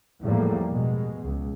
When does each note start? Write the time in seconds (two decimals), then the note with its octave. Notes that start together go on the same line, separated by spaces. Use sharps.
0.23 E2 A2 F3 G3 A3 A#3
0.70 B2 G#3
1.24 C#2